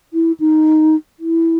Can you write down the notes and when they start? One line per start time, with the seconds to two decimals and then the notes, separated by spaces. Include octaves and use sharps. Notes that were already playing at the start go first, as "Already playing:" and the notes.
0.13 E4
0.40 D#4
1.19 E4